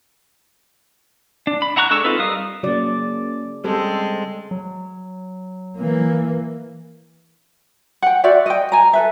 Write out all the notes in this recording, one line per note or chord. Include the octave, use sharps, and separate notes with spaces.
D4
B5
E4 F#5 A#5 C#6 F#6
G#3 D4 A4 C#6 E6
C4 D#4 F4 A4 B4
G3 A#4 F5 D#6
C#3 F#3 A#3 D5
G3 G#3 C4 A4 C5
F#3
E3 A#3
F#5 G5
F#4 C5 D5 E5
D#5 G5
G#5 A#5
A4 B4 E5